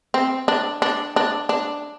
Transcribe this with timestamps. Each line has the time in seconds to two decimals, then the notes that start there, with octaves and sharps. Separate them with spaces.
0.14 C4
0.48 D4
0.82 D4
1.16 D4
1.49 D4